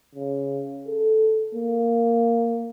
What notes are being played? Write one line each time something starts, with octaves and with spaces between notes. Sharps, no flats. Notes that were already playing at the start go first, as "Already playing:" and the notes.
C#3
A4
A#3